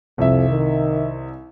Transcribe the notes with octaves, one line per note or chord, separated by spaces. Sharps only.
C2 F2 E5
D#3